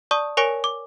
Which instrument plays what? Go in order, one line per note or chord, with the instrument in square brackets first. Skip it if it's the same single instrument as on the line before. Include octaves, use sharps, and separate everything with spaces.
[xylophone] D5 A5 C#6 D#6
A#4 C#5 G#5 C#6 A#6 D7
D6